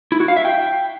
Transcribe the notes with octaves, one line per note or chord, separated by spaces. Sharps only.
E4
F#4
F5
E5
G5